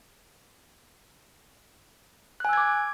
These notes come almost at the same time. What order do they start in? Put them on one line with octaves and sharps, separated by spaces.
F#6 G#5 E6 G#6 D6